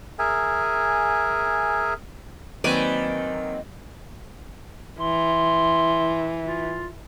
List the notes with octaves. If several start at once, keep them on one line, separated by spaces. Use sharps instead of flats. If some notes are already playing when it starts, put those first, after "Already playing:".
G#4 A#4 E5 G#5
D#3 F#3 A#3 C4 B4 D5 G#5
E3 C6
F4